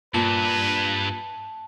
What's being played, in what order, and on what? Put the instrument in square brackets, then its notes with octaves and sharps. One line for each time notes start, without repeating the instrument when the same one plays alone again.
[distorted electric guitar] G2 [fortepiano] A#2 [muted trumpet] B4 [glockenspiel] A5